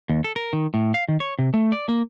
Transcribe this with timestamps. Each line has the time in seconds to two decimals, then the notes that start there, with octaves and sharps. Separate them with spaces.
0.09 D#2
0.24 A4
0.36 A#4
0.53 D#3
0.74 A2
0.94 F5
1.08 D#3
1.20 C#5
1.39 C3
1.54 A3
1.72 D5
1.89 A#3